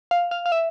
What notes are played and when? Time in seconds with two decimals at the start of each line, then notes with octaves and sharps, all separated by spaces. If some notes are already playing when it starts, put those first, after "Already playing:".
0.11 F5
0.31 F5
0.46 F5
0.52 E5